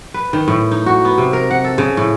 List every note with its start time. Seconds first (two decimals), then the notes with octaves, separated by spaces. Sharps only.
0.14 B4
0.33 D#3
0.48 A2
0.71 D#4
0.86 F#4
1.05 B3
1.18 C3
1.33 A#4
1.50 F#5
1.64 A4
1.78 C#3
1.97 A2